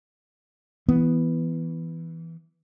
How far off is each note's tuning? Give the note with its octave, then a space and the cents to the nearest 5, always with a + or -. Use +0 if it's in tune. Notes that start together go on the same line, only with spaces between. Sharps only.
E3 +0 B3 +0